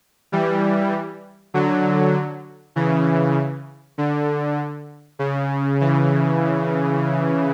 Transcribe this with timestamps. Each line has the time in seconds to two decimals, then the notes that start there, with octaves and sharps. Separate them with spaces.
0.32 E3 G3
1.54 D3 F#3
2.76 C#3 E3
3.98 D3
5.19 C#3
5.80 C#3 E3